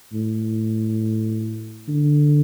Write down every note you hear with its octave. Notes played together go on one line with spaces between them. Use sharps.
A2
D3